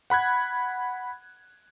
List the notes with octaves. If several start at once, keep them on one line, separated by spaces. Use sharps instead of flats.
F#5 B5 F#6 G#6